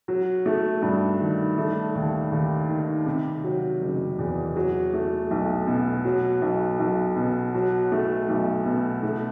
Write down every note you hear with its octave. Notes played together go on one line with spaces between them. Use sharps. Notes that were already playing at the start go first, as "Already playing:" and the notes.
F#3
A3
G2
D#3
A3
D#2
D#2
D#3
C3
F#3
F#1
E2
F#3
A3
B1
B2
F#3
B1
B1
B2
F#3
A3
B1
B2
A3